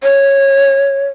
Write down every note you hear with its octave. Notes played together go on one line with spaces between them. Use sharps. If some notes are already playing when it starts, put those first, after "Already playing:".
C#5